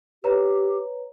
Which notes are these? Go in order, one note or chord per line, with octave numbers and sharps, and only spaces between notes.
G4 B4 C#5 A#5